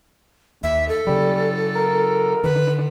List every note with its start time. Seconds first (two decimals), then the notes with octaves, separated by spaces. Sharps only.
0.63 D#2 E5
0.89 A4
1.07 C#3 F#3 G3
1.76 A#4
2.44 D3 D#3 B4